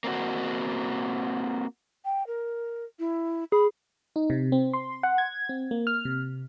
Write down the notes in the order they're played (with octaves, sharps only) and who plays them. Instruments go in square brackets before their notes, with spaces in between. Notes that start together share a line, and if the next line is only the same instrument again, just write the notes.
[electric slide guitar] A#3 C4 D4 F#4
[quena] G5
A#4
E4
[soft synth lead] G#4 [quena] B5
[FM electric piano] D#4
C3
C4
C6
F#5
G#6
C4
A#3
F6
C3